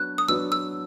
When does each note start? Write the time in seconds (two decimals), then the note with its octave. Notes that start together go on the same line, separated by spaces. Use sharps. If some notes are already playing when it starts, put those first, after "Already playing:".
Already playing: F#3 B3 D4 F#4 F#6
0.18 D#6
0.28 F#3 B3 D4 F#4 E6
0.52 E6